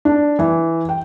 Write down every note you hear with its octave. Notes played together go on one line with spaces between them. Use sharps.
D4
E3
G5